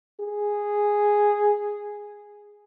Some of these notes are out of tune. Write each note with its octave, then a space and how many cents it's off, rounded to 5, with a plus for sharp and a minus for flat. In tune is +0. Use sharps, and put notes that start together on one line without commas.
G#4 -5